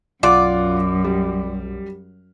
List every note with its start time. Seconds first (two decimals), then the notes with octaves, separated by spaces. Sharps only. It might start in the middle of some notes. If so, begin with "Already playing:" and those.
0.23 B1 F#2 F4 D5 F#5
1.04 G3